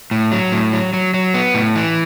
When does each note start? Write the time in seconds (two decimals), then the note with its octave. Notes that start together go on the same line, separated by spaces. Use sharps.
0.11 A2
0.32 F#3
0.52 A2
0.73 F#3
0.93 F#3
1.14 F#3
1.34 B3
1.55 A2
1.75 E3